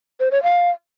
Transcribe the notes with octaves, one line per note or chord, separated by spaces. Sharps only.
C5
C#5
F5